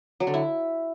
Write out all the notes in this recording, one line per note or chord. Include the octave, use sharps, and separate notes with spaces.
F#3
D3
E4